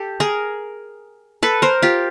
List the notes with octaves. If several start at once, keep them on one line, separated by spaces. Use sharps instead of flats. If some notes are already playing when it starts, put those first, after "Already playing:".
Already playing: G4 A4
G#4 A#4
A4 B4
A#4 C5
F4 G4